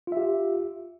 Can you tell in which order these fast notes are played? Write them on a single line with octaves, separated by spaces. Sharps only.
F4 E5 G4